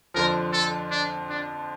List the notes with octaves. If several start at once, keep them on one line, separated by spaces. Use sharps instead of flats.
F2 D3 F3 A#4
A4
D4
D4